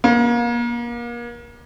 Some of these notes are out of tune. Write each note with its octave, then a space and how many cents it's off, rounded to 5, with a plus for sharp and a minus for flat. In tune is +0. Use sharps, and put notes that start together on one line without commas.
A#3 +35